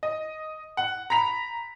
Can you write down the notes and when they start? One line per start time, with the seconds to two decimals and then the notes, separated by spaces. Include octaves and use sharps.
0.03 D#5
0.77 F#5
1.10 A#5 B5 B6 F7